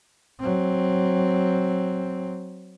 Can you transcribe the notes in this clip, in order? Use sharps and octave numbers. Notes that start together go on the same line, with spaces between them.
F#3 C4